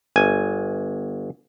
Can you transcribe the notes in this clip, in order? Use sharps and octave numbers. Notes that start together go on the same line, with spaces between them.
G1 G#5